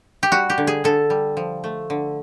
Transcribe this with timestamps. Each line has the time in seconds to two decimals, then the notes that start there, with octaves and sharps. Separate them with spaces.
0.23 G4
0.32 G3 F#4
0.50 G4
0.58 D3
0.67 G#4
0.84 D3 A4
1.10 G3
1.37 F3
1.64 A3
1.90 D3